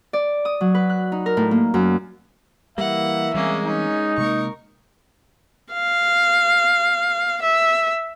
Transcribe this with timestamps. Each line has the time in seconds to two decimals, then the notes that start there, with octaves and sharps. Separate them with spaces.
0.13 D5
0.45 D#6
0.61 F#3
0.75 B4
0.90 F#6
1.12 D#4
1.26 A#4
1.37 A2
1.51 A#3
1.74 F#2
2.78 E3 G3 A#3 E5 F#5
3.35 E3 G3 G#3 A#3 C4 C#4
3.66 C#4 D#4
4.18 C3 G#3 A#3 A#4 C#6
5.73 F5
7.42 E5